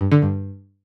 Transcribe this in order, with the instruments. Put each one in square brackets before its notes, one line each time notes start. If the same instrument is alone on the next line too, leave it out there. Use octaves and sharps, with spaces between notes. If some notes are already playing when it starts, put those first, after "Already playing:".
[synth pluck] G2
D3
G2